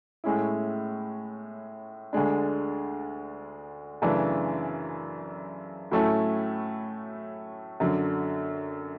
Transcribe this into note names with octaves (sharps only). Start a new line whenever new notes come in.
A2 G#3 C#4 E4
D2 D3 G#3 D4
F#2 C#3 E3 A3 D4
A2 F#3 A3 C#4 E4
F#2 D3 F#3